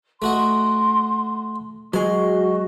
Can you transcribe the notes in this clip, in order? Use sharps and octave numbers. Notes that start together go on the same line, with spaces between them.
A3 F#4 D#5 C6
F#3 G#3 F#4 C5 D#5 C#6